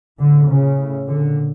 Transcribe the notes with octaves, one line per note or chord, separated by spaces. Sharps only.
A2 D3
A#2 C#3
A2
A#2 D3